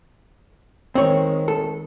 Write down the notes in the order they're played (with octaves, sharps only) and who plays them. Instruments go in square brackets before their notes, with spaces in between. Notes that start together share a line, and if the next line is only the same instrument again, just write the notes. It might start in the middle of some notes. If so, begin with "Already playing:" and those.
[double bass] D#3 G#3 [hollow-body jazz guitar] C4 C#5
[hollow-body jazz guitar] A4